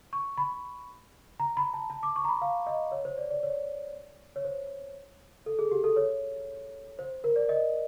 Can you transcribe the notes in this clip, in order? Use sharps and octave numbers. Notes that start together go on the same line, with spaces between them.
C#6
B5
A#5
B5
A5
A5
D6
C#6
A#5
B5
F5
D#5
C#5
C5
D5
D5
C#5
C#5
C5
A4
G#4
G4
A4
C#5
C5
A#4
D5
D#5